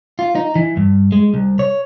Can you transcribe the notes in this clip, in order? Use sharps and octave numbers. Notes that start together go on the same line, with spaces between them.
F4
D#4
E3
G2
G#3
C2
C#5